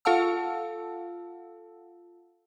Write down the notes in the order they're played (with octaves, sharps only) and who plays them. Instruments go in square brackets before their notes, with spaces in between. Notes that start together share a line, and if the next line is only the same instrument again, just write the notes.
[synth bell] F4 A4 F5 F#5 A5 E6